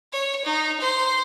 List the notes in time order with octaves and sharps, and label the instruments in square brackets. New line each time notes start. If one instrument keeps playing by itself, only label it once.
[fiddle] C#5
D#4
C5